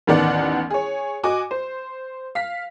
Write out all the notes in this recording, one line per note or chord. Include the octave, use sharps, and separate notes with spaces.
A1 D#2 D#3 B3 D5 F#5
G#4 C#5
F#4 D#5 G#5 D6
C5
F5 B6